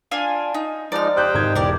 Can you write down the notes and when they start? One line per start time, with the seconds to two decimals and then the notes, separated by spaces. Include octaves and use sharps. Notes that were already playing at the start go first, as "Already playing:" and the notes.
0.11 D4 F4 G#5
0.54 D#4
0.92 F3 G#3 D#4 D5 F6
1.16 G4 C5 G5 D#6 F#6 G6
1.34 G#1 D#4 G#6
1.55 E1 G4 A#4 D5